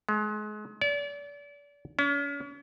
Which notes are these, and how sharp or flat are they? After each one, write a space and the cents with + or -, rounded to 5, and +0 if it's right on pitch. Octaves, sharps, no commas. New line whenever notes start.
G#3 +30
D5 -35
C#4 +40